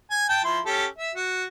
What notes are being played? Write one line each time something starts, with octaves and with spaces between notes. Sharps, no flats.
G#5
G5 A5
F3 E4 C6
C#4 G4 A4
E5
F#4